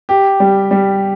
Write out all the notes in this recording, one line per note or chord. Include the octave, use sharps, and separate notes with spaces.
G4
G3
G3